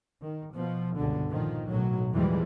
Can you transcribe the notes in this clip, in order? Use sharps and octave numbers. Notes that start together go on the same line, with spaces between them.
D#3
B2 F3
G1 C#2 B2 D3
A#2 D#3 F3
B1 A2 F#3
E2 B2 E3 F3 G3 G#3